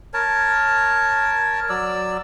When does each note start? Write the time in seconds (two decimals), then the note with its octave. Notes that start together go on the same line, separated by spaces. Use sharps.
0.14 A#4 C#5 A5
1.69 F#3 D5 E6